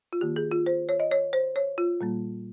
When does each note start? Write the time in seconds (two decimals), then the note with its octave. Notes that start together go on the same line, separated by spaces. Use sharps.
0.13 F4
0.21 D#3 A#3 G4
0.36 G#4
0.52 F4
0.66 C5
0.89 C#5
1.00 D#5
1.12 C#5
1.33 C5
1.56 C#5
1.78 F4
2.01 A#2 G3 A#3